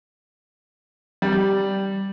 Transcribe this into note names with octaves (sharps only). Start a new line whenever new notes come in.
G3